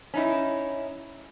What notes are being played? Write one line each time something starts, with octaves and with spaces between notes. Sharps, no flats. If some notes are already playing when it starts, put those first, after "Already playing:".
C#4 D#4 E4